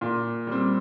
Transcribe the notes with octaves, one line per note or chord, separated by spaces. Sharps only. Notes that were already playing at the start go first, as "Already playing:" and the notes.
A#2
G3 C4